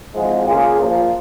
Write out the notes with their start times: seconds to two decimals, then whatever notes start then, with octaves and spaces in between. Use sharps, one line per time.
0.14 G#1 G#2 F3 G#3
0.46 C#3 A#3 F4 G#4
0.78 A#2 F3 A#3 F4